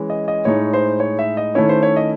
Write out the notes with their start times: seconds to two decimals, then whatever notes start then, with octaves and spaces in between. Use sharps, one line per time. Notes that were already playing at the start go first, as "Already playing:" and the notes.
Already playing: E3 G#3 C#4
0.10 D#5
0.28 D#5
0.45 A2 G#3 D#4 C#5
0.73 C5
1.00 C#5
1.19 E5
1.37 D#5
1.55 D#3 A3 C#4 E4 C#5
1.69 C5
1.83 C#5
1.96 D#5